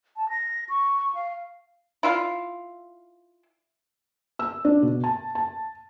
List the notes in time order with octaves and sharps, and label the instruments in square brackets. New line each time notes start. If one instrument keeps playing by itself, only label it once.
[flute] A5
A#6
C#6
F5
[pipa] E4 F4 F5
[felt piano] E6
D4
B2
A5
A5